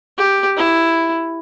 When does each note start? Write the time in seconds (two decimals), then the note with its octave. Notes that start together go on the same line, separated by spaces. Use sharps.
0.17 G4
0.57 E4